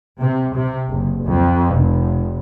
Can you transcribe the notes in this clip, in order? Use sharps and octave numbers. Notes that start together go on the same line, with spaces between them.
C3
C3
F#1
F2
F1